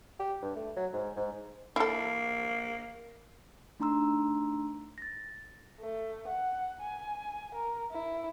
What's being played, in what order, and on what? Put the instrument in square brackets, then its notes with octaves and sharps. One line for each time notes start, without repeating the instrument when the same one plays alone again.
[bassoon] G4
G2
A3
F#3
G#2
G#2
[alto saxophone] A#3 [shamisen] E4 A4
[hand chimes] A3 D4 D#4 A#5 C6 E6
A6 A#6
[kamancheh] A3
F#5
G#5
A#4
E4